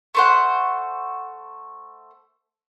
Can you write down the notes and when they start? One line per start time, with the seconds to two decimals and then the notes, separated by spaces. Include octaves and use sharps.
0.15 A3 C5 F#5